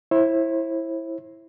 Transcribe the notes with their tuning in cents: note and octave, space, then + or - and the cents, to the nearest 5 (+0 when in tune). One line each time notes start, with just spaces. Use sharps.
E4 +0 C5 +40